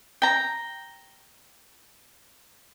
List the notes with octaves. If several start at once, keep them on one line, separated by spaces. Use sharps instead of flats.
G5 A#5